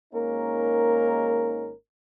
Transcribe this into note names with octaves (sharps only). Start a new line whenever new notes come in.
G#1 G#2 A#3 C#4 D#4 A#4